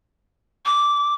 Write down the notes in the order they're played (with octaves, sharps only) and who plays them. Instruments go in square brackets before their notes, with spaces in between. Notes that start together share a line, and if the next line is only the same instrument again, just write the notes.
[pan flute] D6